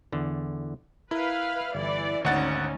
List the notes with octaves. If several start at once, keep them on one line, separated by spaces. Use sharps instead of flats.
E2 D3
E4 A#4 B4 F5
G1 E3 D5
G#1 D2 C#4 D#4 C#5 F#5 G#5 A6